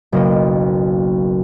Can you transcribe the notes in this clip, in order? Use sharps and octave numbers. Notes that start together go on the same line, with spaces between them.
F#1 B1 A#3 D#5